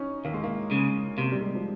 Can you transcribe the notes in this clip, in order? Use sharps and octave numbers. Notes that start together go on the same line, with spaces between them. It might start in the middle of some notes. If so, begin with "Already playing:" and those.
Already playing: C#4 D#4
D#2 A#3
G#3
A#3
C#3 G#3
C3 A#3
G3
G#3
F3